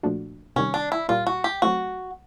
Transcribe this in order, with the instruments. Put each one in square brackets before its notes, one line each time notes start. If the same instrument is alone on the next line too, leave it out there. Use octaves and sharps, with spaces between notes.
[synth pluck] A#2 F3 A3 D4 F#4
[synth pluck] C3 D#3 G3 [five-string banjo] C#4
[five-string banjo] D4
E4
[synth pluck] A#2 G3 A#3 [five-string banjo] F4
[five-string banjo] F#4
G4
[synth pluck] F#3 A3 C4 [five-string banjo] F#4